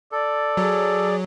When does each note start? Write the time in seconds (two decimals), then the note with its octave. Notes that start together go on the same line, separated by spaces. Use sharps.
0.12 A4 D5
0.57 F#3 G#4